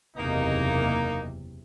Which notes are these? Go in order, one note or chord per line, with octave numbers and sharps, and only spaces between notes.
F#1 E2 C3 A#3 D#4